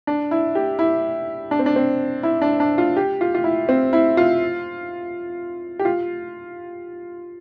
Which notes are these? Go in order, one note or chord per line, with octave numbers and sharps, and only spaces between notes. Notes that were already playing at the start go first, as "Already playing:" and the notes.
D4
E4
G4
E4
D4
C4
D4
C4
E4
D4
D4
F4
G4
F4
F4
E4
C4
E4
F4
G4
F4